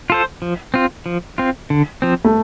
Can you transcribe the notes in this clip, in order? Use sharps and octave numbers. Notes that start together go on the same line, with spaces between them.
F4 A4 C5
F3
C4 F4
F3
C4 F4
D3
F3 C4
A3